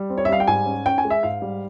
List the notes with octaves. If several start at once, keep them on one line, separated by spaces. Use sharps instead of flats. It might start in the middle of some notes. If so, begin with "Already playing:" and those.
Already playing: G3
C4
C#5
E5
G3 F5
G5
G#2 G#5
C#4
C#4 G5
G#5
G#3
E5
G#2 F5
G3